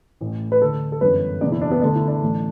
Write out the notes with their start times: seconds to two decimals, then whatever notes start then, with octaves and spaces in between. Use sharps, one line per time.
0.21 A1 A2 E3
0.52 B4
0.62 D2 D3 A4
0.92 A4
1.01 G1 F#2 E3 B4
1.41 F#1 E2 B2 D5
1.52 E4
1.61 D4
1.71 B3
1.82 D2 D3 D4
1.95 E4
2.08 D4
2.22 A1 A2 E3